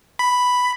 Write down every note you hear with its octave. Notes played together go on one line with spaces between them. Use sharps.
B5